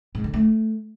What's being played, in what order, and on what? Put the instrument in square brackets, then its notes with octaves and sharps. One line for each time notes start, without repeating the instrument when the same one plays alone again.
[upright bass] G#2
D3
A3